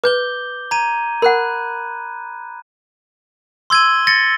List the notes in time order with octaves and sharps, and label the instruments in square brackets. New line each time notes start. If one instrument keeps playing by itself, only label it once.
[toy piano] B4 [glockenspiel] D6 G6 G7
[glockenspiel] A#5 G#6 D#7
[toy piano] A#4 F#5 [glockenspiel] B5 F#6
[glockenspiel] C6 G#6 D#7 [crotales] E6 G7
[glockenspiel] A6 A#6 C#7